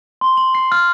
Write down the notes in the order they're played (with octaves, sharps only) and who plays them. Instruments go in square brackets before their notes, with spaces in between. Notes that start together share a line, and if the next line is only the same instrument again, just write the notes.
[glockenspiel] C6
F#7
C7
F6